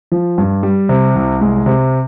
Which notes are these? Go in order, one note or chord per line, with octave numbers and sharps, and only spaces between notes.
F3
G2
G3
C3
C2
G#3
C3